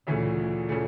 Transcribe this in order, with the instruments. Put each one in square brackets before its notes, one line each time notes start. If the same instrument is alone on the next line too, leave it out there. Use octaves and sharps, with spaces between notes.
[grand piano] D2 C#3 E3 A3 [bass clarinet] A#2
[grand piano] C#3 E3 A3